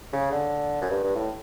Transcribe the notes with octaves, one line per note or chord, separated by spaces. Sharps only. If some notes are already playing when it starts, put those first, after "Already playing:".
C#3
D3
F#2
G2
G2
A2